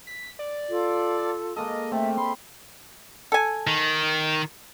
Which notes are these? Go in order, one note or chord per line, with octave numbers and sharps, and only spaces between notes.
B6
D5
F4 A4
G#3 A#3 A4 D#5
A3 C4 E5
B5 C6
A4 G#5
D#3